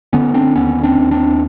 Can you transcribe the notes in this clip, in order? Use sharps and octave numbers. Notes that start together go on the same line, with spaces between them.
D3 B3 C#4
C4 D4
D#2 B3 C#4
C4 D4
D#2
C4 D4